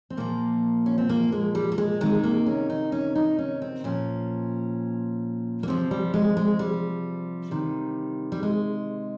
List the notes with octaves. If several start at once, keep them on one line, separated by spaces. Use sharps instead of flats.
C4
A#2 F3 A#3
C#4
C4
A#3
G#3
G3
A#3
G#3
C3 D#3 G#3
A#3
C#4
D#4
C#4
D#4
C#4
C4
A#2 F3 C#4
A#3
C3 F3 C4
G3
G#3
G#3
G3
C3 D#3
G3
G#3